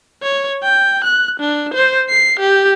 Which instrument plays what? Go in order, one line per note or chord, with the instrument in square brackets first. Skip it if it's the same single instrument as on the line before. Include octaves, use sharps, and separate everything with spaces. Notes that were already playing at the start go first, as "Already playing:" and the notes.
[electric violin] C#5
G5
F#6
D4
C5
C7
G4